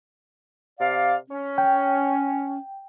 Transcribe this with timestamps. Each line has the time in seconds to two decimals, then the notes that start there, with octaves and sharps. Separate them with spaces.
0.80 C3 D5 F5
1.30 C#4
1.58 G5